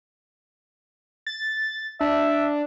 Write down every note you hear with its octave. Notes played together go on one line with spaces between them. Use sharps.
A6
D4 E5